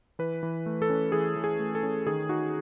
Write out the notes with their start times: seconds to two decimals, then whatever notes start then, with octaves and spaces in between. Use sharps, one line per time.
0.19 E3 B4
0.43 E3
0.66 A3
0.82 A4
0.90 C#4
1.12 E3 G#4
1.36 E3
1.44 G#4
1.59 A3
1.75 A4
1.83 C#4
2.07 D#3 G#4
2.29 D#4 F#4